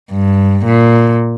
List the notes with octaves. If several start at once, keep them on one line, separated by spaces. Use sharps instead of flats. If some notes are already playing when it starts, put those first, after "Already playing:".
G2
A#2